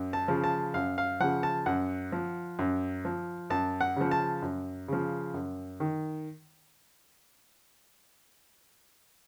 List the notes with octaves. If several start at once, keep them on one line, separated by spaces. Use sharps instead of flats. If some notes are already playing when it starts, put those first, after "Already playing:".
Already playing: F#2
A5
C#3 F3
A5
F#2 F5
F5
C#3 F3 F#5
A5
F#2 F#5
F3
F#2
F3
F#2 A5
F#5
C#3 F3
A5
F#2
C#3 F3
F#2
D#3